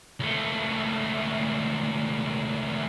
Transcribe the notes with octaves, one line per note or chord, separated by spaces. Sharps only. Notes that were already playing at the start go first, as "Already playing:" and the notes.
C#2 A3